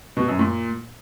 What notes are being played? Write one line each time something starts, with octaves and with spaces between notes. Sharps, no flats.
B2
F#2
A#2